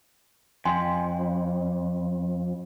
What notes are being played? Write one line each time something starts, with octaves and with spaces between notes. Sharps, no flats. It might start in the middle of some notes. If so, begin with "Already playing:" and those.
F2 G5 G#5 C6